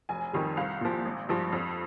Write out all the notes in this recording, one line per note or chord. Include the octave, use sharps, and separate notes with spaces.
F1 G#5
F2 D#3 G3
C2 F5
A#2 F3
G#1
G2 F3
F2